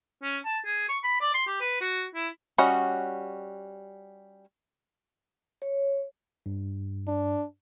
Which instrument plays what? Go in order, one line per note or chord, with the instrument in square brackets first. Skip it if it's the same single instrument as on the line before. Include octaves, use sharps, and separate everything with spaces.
[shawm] C#4
A5
G#4
C#6
B5
D5
C6
G4
B4
F#4
E4
[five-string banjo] G3 C#4 F#4 D#5 F#5
[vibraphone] C#5
[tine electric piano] G2
[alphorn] D4